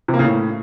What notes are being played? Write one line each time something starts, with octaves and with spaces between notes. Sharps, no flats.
C3
A#3
C#3
A2